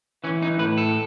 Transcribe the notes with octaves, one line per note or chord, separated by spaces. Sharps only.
E3 C#4
D#4
A2 B4
A4